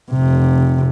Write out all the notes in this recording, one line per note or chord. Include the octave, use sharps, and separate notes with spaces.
F1 C3